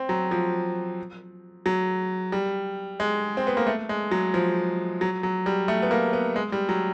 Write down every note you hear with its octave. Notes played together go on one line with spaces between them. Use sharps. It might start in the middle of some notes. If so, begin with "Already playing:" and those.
Already playing: C4
F#3
F3
F#3
G3
G#3
C4
B3
A#3
A3
G#3
F#3
F3
F#3
F#3
G3
A3
B3
A#3
B3
G#3
G3
F#3